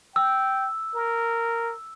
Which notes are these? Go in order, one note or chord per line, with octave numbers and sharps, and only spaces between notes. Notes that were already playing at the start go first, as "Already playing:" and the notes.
G5 E6
A#4